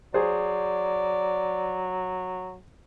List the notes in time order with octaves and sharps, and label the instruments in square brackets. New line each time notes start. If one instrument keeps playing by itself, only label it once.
[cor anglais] F#3 [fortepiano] G#4 C5 [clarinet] D5